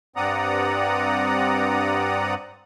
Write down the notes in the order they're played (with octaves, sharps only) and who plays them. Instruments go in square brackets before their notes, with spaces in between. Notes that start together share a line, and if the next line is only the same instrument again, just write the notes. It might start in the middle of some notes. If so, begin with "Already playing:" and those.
[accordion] G2 C4 D5 F#5 A#5 D#6